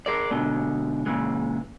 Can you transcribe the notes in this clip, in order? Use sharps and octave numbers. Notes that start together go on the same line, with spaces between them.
G#4 A#4 D5
G#2 B2 D3
A#2 C#3 E3 G#3